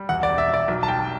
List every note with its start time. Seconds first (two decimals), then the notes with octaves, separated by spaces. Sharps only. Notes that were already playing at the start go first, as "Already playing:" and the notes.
Already playing: G3
0.09 E2 F#5
0.23 D5
0.29 E1
0.38 E5
0.48 E1
0.54 D5
0.68 B1
0.83 A5
0.88 G3 G5